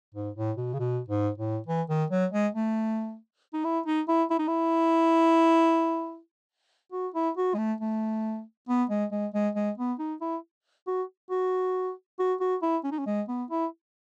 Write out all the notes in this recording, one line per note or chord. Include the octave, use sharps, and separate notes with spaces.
G#2
A2
B2
C#3
B2
G#2
A2
E3
D#3
F#3
G#3
A3
D#4
E4
D#4
E4
E4
D#4
E4
F#4
E4
F#4
G#3
A3
A3
B3
G#3
G#3
G#3
G#3
B3
D#4
E4
F#4
F#4
F#4
F#4
E4
C#4
D#4
C#4
G#3
B3
E4